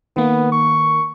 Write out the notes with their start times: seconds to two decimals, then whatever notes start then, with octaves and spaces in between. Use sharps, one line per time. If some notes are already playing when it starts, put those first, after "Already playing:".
0.17 D#3 A#3 B3
0.52 C#6